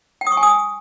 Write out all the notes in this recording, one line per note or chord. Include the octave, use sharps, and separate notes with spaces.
G5
D#6
C#6
G#5
D#6